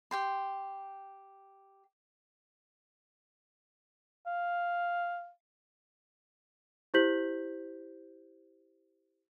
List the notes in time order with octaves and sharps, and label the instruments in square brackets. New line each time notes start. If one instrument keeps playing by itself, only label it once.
[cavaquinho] G4 G5 C6
[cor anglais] F5
[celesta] E4 G4 C5 G6 B6 F#7